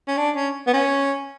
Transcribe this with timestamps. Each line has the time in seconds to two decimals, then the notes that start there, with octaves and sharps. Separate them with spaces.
0.08 C#4
0.18 D4
0.36 C#4
0.67 B3
0.73 C#4